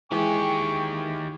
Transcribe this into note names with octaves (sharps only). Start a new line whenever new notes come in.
D#3 E3 G#3 G4 G5 C#6